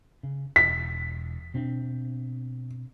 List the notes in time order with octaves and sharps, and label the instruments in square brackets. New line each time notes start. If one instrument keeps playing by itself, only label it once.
[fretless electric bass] C#3
[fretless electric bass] E1 [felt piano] B6
[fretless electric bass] B2 C4 D4